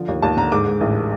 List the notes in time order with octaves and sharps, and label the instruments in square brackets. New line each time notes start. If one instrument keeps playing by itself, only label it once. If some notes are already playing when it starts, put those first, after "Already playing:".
Already playing: [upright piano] D3 F3
D#2
D#2 A5
D3 A#5
G#2 D6
G#2
A1